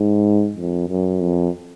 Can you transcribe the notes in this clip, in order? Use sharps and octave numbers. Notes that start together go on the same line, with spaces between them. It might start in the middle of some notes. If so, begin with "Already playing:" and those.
Already playing: G#2
F2
F#2
F2